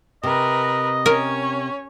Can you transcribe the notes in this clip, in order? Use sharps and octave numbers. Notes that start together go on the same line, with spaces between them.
C3 A#4 B4 D#5
C#4 A#4 C#5